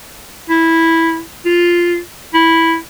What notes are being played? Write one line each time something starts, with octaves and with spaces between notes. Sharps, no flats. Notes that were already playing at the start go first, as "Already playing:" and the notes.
E4
F4
E4